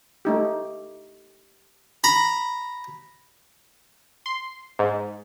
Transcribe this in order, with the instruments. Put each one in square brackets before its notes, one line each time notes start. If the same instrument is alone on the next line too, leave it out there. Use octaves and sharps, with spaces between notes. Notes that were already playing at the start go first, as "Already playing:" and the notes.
[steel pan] A3 D#4 G4
[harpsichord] A#5 B5
[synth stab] C6
G#2